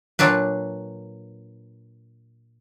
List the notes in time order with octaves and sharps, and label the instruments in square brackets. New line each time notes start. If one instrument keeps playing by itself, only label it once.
[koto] A#2 F#3 D4 B4